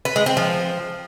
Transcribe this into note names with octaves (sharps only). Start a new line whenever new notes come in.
B4
G#3
C4
F3